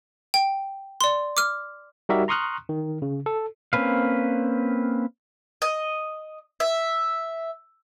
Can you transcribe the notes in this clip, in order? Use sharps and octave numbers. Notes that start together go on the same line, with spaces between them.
G5
D5 C6
D6 F6
G3 D#4 F#4 G4 A#4 E5
A#5 C6 C#6 D#6 F6 F#6
D#3
C#3
A4
A#3 C4 C#4 B4 F5
D#5
E5